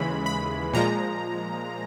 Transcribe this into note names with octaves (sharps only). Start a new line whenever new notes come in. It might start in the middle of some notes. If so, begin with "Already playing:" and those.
Already playing: D#2 C#3 E3 G#3 B5
B5
A#2 F3 G#3 A#5